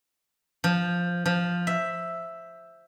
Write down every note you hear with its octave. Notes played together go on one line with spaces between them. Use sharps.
F3
F3
E5